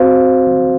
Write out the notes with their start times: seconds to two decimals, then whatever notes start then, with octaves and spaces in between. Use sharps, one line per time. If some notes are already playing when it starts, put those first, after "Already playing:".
Already playing: C4 F#4 C5 F5